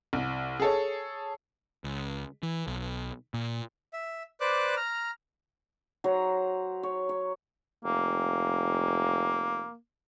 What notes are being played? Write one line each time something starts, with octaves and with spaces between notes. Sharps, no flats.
C2
G#4 A4 C#5
C#2
E3
B1
A#2
E5
B4 C5 D5 D6 F#6
A#5 F6
F#3 C5 A#5
C#5
C#5
F1 A#3